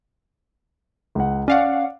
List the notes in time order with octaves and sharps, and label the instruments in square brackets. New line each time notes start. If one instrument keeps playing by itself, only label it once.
[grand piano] C#2 F#5
[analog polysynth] C#4 F5 F#5 [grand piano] D5